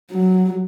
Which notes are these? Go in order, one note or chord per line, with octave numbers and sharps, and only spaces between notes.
F#3